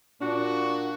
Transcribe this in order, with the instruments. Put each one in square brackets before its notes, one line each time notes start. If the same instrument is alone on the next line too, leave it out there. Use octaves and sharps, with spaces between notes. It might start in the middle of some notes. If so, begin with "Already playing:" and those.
[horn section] A#2 F#4 [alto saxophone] D4